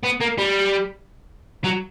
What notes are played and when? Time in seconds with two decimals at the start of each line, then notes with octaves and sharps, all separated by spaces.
0.03 B3
0.20 A#3
0.38 G3
1.64 F#3